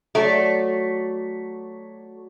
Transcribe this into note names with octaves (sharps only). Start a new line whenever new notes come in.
F#3 A3 D5